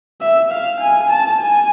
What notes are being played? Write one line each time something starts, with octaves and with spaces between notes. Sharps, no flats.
E5
F5
G#5
A5
G#5